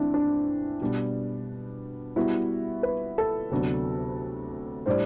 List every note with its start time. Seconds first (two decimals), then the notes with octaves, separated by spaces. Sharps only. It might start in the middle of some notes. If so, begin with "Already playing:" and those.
Already playing: E3 A3 C4 D4 E4
0.14 D4
0.81 B2 G3 B3 D4
2.16 G3 B3 E4 F#4
2.83 B4
3.18 A4
3.51 D2 C3 F#3 B3 D4
4.86 A2 G3 D4 G4 C5 D5